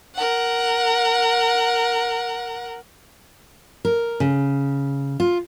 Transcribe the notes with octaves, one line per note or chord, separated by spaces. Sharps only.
A#4 F#5
A#4
C#3
F4